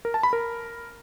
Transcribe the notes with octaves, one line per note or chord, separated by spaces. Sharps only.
A#4
A5
B5
A#4